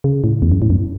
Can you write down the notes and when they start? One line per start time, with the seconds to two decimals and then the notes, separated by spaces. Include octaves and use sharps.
0.04 C#3
0.24 A2
0.42 E2
0.52 F#2
0.62 A2
0.70 F#2